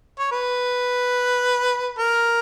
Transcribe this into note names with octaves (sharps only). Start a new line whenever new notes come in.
C#5
B4
A#4